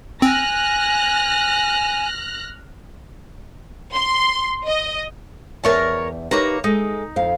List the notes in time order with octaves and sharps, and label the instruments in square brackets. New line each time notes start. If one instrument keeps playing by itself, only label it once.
[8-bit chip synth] C4 [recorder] G#5 [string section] F6 F#6 A#6
[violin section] C6
D#5
[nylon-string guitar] E2 D5 E5 [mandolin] A#4 C#5 A5
[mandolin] A#3 C#5 A#5 [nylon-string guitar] D#4 G4 B4
[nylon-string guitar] G#3 A4 [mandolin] D#4
[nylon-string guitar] F2 F5